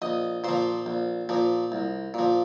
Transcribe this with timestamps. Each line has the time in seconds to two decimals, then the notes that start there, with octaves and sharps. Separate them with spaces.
0.02 A#1 D#5
0.44 A#2 F3 C5
0.86 A#1
1.29 A#2 F3
1.72 C2
2.14 A#2 F3